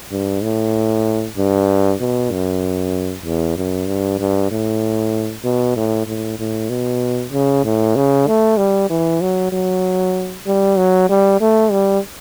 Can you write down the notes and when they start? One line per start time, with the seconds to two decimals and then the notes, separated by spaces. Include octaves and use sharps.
0.11 G2
0.43 A2
1.37 G2
2.00 B2
2.31 F#2
3.25 E2
3.57 F#2
3.87 G2
4.19 G2
4.51 A2
5.44 B2
5.77 A2
6.07 A2
6.39 A2
6.70 B2
7.32 C#3
7.64 A2
7.96 C#3
8.27 A3
8.57 G3
8.90 E3
9.21 F#3
9.52 F#3
10.47 G3
10.77 F#3
11.09 G3
11.41 A3
11.71 G3